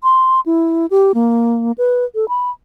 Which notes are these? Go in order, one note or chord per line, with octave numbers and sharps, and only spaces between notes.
C6
E4
G4
A#3
B4
A4
B5